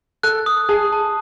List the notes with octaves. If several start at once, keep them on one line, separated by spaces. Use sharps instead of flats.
A4 F#6
D#6
G#4 A5
A5